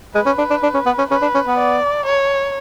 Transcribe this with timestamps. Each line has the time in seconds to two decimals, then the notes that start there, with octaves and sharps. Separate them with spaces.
0.15 G#3 B4
0.26 C#4
0.38 D4
0.50 D4
0.63 D4
0.74 C#4
0.86 B3
0.98 C#4
1.10 C#4 B4
1.22 D4
1.35 C#4
1.47 B3
1.58 D5
2.06 C#5